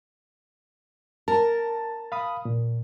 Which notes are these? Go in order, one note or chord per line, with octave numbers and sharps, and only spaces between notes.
A#4 A5
F5 B5 D#6
A#2